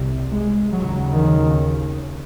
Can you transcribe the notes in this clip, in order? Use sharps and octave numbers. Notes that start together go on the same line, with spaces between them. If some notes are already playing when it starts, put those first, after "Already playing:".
Already playing: C2 C3
G#3
D#2 C#3 F#3
D#3